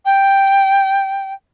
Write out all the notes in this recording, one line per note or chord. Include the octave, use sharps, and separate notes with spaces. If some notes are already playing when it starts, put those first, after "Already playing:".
G5